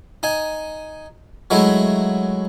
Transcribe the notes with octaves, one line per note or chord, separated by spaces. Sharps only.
D#4 G#5
F#3 G#3 A3 E4